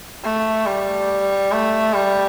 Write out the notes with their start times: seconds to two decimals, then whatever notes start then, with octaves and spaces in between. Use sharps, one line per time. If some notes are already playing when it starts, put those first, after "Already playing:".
0.23 A3
0.66 G3
1.51 A3
1.94 G3